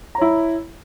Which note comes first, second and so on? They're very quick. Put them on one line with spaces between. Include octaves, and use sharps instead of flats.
A#5 C#5 E4